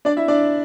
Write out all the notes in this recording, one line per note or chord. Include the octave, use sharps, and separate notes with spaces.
D4 D5
E4 E5
D4 D5